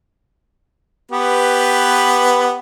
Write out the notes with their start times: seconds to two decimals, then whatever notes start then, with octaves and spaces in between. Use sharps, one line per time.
1.12 B3 G4 B4